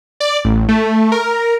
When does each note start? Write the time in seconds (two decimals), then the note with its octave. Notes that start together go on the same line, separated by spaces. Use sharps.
0.20 D5
0.45 A1
0.68 A3
1.12 A#4